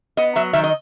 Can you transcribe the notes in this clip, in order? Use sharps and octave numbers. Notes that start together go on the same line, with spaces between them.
B3 D#5
F#3 E5
D#3 E5
D#5